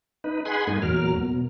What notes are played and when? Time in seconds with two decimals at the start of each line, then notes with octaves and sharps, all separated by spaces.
0.24 D#4 B4
0.45 G#4 F#5 G#5 B5 C6
0.67 G2 A#3 D#4 G#5
0.82 E2 A#2 F#3 A#4 F6
1.19 B2